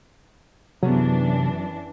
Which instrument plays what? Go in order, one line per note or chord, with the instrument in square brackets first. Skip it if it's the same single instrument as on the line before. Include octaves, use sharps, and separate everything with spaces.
[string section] F#2 E3 D4 [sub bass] C3 [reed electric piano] F#3 [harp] B3 C#4 G#4